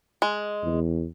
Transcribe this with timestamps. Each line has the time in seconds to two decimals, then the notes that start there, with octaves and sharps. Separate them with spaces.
0.22 G#3
0.64 E2